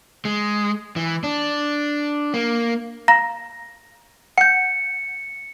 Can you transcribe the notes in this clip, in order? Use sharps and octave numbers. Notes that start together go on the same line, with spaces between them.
G#3
E3
D4
A#3
F5 A#5 A#6
F#5 G6 C#7